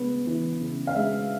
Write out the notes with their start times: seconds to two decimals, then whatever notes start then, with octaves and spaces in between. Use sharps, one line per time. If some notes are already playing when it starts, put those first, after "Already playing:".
Already playing: C#3 G#3 B3
0.27 E3
0.61 C#3
0.87 F5
0.95 G#3 E5